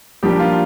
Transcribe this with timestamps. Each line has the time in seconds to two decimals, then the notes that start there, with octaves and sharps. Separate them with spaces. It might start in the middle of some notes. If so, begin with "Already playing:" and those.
0.23 A#2 F3 G3 A#3 D4 G4
0.40 F4